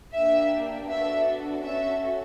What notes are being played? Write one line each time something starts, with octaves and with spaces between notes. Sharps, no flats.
A#3 D4 G4 E5
B3 D4 F#4 A4 E5
C#4 F#4 A4 E5